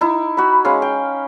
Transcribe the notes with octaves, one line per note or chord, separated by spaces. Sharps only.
D#4 E4
F#4 B5
G#3 C#4 F5
G5